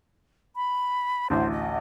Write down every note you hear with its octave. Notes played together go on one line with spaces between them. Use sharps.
B5
A1 D2 C5
D#5